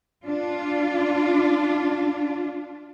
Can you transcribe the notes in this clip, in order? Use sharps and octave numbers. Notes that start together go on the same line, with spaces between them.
D4 F4